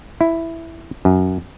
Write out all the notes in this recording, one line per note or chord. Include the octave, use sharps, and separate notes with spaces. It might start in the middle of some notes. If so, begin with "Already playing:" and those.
E4
F#2